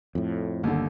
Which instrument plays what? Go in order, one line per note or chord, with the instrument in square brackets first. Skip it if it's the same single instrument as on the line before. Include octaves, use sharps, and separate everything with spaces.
[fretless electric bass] F2 A2
[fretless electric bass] G1 [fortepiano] D#2 D3